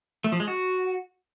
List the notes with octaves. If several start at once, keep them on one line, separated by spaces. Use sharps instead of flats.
A3
F3
G#3
F#4